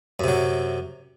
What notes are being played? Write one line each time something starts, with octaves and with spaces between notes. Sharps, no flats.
F#2 C3 F#3